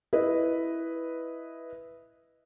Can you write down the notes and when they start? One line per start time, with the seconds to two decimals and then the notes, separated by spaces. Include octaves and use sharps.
0.13 E4 B4 D#5